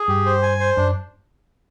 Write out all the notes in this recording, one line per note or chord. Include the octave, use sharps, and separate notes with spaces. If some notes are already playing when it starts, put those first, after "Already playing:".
Already playing: G#4
G2 G4
C5
G#5
C5
F#2 D4